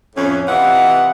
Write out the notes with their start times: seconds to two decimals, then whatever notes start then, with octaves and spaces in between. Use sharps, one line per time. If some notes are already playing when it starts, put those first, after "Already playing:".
0.15 F2 A2 C#4
0.47 C3 E3 E4 F4 D#5 F#5